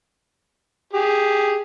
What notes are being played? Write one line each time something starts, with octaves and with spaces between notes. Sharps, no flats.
G4 G#4